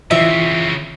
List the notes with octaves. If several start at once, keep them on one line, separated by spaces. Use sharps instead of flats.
C#3 E3 C4 F4 E5